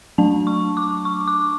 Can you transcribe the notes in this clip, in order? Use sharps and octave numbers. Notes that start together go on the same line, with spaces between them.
F#3 A3 D4 A5
C#6
D6
C#6
D6